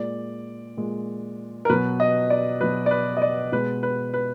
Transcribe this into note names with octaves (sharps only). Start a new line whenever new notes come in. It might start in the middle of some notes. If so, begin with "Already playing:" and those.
Already playing: A#2 G#3 D5
A#2 G#3
A#4
B2 F#3 B4
D#5
D5
B2 F#3 B4
D5
B4
D#5
D5
B2 G#3 B4
B4
B4